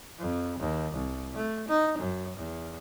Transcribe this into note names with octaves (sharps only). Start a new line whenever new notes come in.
F2
D#2
C2
A3
D#4
F#2
E2